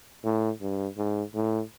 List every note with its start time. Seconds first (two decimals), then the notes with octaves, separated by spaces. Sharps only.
0.24 A2
0.61 G2
0.98 G#2
1.35 A2